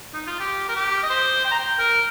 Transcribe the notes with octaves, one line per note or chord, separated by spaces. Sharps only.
D#4
F4
G4
A#4
G4
D#5
C5
G5
A#5
G5
A#4